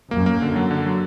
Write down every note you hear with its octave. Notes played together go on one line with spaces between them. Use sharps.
F#2 A#3
A#3
D3
F#3
D3
F#3